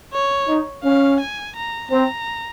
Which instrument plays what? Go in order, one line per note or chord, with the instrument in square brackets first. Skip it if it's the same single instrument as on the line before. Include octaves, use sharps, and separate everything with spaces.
[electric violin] C#5
[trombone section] D#4
[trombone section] C#4 [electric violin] F5
[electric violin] G#5
A#5
[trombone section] C4 [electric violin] A#5